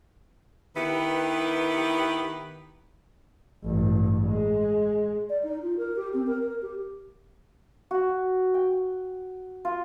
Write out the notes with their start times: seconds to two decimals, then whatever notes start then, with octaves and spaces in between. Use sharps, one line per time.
0.75 D#3 B3 E4 G4 B4
3.64 A1 G2
4.30 G#3
5.29 D5
5.43 D#4
5.62 F4
5.77 A#4
5.96 G4
6.14 C4
6.27 A#4
6.42 A#4
6.62 G4
7.91 F#4
8.54 G5
9.65 F4